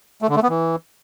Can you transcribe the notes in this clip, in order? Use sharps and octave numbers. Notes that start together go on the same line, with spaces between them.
A3
D3
A3
B3
E3